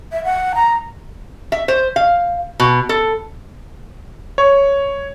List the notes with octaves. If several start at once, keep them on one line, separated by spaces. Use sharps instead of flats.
E5
F#5
A#5
E5
C5
F5
B2
A4
C#5